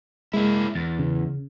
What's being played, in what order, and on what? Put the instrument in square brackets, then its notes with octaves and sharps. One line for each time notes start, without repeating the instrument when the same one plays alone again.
[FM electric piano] G#3 [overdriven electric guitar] A#3 E4
[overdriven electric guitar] E2 [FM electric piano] A6
[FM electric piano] C#3